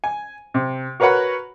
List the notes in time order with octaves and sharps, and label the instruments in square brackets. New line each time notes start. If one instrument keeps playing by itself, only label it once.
[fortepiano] G#5
C3
F#4 A#4 B4 C#5 F#5 B5